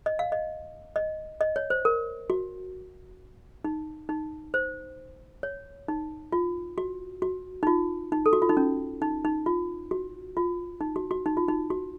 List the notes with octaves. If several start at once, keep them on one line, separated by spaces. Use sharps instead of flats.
D#5
F5
D#5
D#5
D#5
C#5
C5
A#4
F#4
D#4
D#4
C5
C#5
D#4
F4
F#4
F#4
D#4
F4
D#4
A4
F#4
F4
D#4
C#4
D#4
D#4
F4
F#4
F4
D#4
F#4
F#4
D#4
F4
D#4
F#4